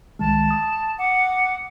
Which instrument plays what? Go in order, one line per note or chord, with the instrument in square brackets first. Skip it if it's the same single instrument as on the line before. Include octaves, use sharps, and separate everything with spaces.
[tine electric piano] C2 D#3 G#3 [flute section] A5
[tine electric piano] D#6
[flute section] F#5 D6